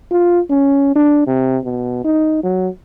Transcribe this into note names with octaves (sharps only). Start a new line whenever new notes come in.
F4
C#4
D4
C3
B2
D#4
F#3